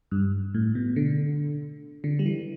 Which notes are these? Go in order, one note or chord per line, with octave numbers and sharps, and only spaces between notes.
G2
A2
B2
D3
D3
G3
E3